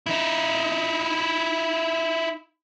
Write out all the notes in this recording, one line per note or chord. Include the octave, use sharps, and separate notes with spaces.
D#4 E4